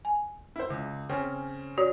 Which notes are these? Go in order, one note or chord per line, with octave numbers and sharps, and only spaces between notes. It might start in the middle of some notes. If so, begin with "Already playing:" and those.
G#5
E4 C5
C#2
C#3 C4 C#4
F#4 C#5 D5